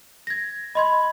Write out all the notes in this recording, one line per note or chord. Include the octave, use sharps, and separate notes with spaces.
G#6 A#6
D#5 B5 C6 G#6